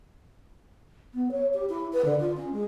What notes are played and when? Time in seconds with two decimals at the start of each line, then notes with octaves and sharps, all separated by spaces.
1.14 B3
1.31 C#5
1.54 G4
1.69 E4
1.93 B4
2.05 D3
2.20 F4
2.37 C#4
2.52 G#3